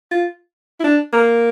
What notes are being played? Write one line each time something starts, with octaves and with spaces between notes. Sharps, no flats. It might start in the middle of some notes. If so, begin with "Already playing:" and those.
F4
E4
D4
A#3